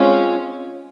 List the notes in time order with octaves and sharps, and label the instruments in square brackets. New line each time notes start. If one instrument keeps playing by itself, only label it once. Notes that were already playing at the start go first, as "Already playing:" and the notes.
Already playing: [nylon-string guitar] G#3 C4 F4 [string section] C#4